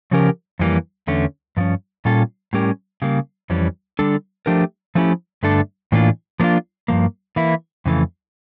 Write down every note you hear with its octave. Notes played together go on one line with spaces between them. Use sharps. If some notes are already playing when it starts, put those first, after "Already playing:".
C#3 F3 C#4 G4 A#4
F2 E3 G3 A#3
E2 D3 A3 C#4
G2 F3 C#4
A#2 G3 C#4 F4 A4
A2 G3 C#4 G4 A#4
C#3 G3 A#3
F2 E3 G3 C#4
D3 G3 D4 A4
F3 A3 D4 G4 A#4
F3 A3 C#4 E4 G4
G2 D3 A3 D4 A4
A2 E3 A#3 D4 F4
F3 A#3 D4 F4
G2 F3 A#3
E3 A#3 E4
F2 C#3 E3 A3